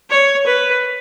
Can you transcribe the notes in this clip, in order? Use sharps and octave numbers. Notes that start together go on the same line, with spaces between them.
C#5
B4